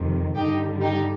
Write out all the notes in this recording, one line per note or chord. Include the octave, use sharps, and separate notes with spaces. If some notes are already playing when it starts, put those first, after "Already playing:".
Already playing: F2 C3 D#3 G3
G2 D3 G3 D#4 G4
D#4 G4